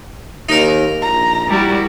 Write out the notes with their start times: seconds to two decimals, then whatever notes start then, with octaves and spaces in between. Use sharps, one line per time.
0.49 D#2 D#4 A#4
1.02 A#1 A#5
1.48 G3 E4 F#4